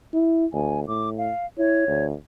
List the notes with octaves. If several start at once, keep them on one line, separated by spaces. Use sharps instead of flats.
E4
D2 G#5
A2 D6
F5
E4 C#5
D2